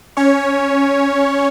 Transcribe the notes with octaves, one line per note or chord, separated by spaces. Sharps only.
C#4 C#5